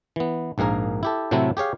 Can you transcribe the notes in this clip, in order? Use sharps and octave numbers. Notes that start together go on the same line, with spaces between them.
E3 B3
A#1 G#2 A#3 G#4 A#4
E4 G4 A4
A2 C3 F#3 A3 C4 E4
G4 G#4 C#5 F5